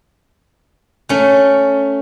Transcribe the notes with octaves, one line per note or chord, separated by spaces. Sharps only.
A3 C#4